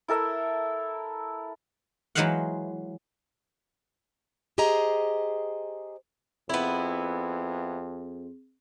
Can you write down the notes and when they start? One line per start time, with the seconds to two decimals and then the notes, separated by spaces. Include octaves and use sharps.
0.08 E4 A4 A#4 E5
2.15 E3 F#3 G#3 C5 F5 F#5
4.58 G4 G#4 C5 D#5 A#5
6.49 F2 B3 C4 E4 G#4